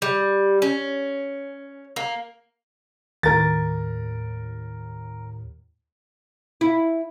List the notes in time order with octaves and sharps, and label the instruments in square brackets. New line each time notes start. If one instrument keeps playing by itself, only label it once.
[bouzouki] G3
C#4
A#3
[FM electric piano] D#2 A2 [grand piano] A#4 A6
[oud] E4